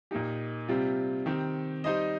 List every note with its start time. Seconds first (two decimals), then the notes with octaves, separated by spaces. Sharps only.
0.11 A#2 A#3 D#4 G4
0.68 C3 G3 C4 F4
1.26 D#3 C4 G4
1.84 G3 D#4 C5 D#5